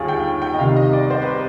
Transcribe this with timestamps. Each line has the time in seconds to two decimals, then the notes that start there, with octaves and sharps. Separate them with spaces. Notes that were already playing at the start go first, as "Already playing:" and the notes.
Already playing: D#2 D3 G3 F4 G#4
0.08 G5
0.42 G5
0.54 D#5
0.59 C2 C3 D#3 G3 F5
0.76 D#5
0.93 D5
1.10 C5
1.22 B4